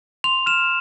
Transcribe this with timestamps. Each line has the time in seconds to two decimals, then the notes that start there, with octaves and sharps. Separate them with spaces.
0.24 C6 F7
0.46 F6 E7